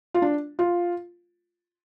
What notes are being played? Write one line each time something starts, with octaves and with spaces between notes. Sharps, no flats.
F4
D4
F4